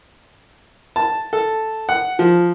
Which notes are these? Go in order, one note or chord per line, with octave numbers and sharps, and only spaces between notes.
A5
A4
F#5
F3